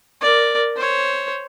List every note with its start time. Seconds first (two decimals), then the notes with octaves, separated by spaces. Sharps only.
0.21 A#4 D5
0.76 C5 C#5